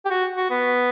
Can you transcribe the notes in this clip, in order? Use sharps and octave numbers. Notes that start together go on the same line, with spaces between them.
G4
F#4
F#4
B3